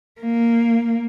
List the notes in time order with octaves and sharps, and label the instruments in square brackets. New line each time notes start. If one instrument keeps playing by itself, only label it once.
[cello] A#3